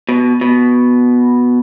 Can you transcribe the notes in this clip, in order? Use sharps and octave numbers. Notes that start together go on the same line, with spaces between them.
B2
B2